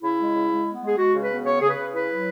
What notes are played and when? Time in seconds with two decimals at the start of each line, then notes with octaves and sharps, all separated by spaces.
0.02 C#3 E4
0.18 G#3
0.34 C#3
0.50 G#3
0.66 B3
0.82 G#3
0.87 G#4
0.98 G#3 F#4
1.14 C#3
1.22 B4
1.29 B3
1.45 C#3 C#5
1.61 C#3 G#4
1.70 B4
1.77 C#3
1.93 E4 B4
2.10 F#3